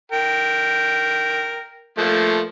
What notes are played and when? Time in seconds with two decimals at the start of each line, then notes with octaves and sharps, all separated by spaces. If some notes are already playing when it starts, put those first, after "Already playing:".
0.12 A#4 G5
1.98 F3 A3 A#3